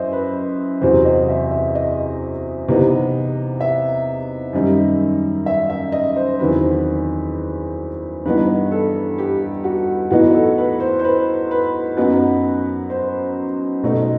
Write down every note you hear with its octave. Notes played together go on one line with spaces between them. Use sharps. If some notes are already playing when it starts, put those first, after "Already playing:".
Already playing: F#2 E3 C5 D#5 E5
B4
E2 C3 F#3 C4 C5
D#5
E5
E5
D#5
C3 E3 B3 D#4
E5
F#2 D#3 G3 D#4
E5
E5
D#5
C5
C5
E2 D#3 F#3 C4 B4
G2 E3 B3 D#4 B4
A4
G4
F#4
A2 E3 B3 D#4 F#4
A4
B4
C5
C5
B4
B4
F#2 F#3 B3 D#4
C5
B2 A3 D#4